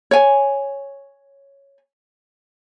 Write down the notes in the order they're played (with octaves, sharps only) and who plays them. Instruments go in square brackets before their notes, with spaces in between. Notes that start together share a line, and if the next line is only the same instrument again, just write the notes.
[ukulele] C#5 G#5